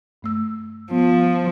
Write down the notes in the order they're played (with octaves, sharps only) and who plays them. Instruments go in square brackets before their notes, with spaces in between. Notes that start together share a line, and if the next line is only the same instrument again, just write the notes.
[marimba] G2 A3 E6
[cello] F3 [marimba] B3